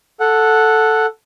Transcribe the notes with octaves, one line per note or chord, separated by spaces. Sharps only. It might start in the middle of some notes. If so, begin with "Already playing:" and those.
A4 F#5